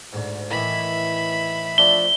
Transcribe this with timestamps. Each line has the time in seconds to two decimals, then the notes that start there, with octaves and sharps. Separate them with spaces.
0.13 D2 G#2
0.50 A2 D#3 E3 E5 B5
1.78 F3 A3 D4 G7